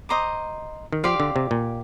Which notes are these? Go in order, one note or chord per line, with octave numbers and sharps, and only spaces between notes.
C5 D#5 A#5 D6
D#3
F3 G4 D5 F5 C6
D3
C3
A#2